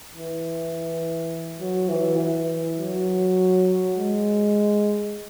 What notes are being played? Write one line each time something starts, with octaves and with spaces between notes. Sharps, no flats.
E3
F#3
E3
E3
F#3
G#3